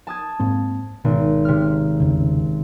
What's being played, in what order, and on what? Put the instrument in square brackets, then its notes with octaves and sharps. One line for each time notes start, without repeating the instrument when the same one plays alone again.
[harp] A5 D#6 G#6
[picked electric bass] G#2 A#3 C4
[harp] G#1 [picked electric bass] B2
[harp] C3 F6
[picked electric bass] E2 C#3